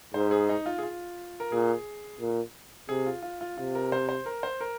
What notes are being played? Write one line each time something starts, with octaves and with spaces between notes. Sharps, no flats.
G#2 C5
G#4
D#4
F4
G#4
F4
A#4
A#2 G#4
A#2
C3 G#4
F4
F4
F4
C3 F4
A#4
C5
C5
A#4
C5
A#4